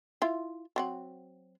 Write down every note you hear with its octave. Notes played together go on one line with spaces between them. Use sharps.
E4 F4
F#3 C4 F#5